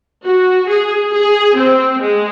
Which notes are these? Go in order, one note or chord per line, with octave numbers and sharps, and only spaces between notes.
F#4
G#4
G#4
C4
G#3